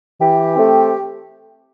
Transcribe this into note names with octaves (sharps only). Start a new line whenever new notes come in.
E3 G4
A3 C4